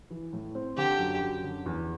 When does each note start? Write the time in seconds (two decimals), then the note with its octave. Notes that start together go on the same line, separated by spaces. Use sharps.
0.10 E3
0.33 A2
0.55 C4
0.77 D3 G4
0.99 F#2
1.21 F#2
1.44 D3
1.66 E2